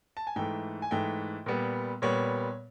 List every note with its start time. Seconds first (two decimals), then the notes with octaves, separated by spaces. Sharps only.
0.17 A5
0.27 G#5
0.36 G#2 E3 A3 G5
0.82 G#5
0.91 G#2 E3 A3 G5
1.46 A#2 G3 B3
2.02 A#2 G3 B3 C#5